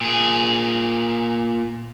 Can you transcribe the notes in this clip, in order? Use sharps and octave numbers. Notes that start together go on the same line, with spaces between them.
A#2 G#4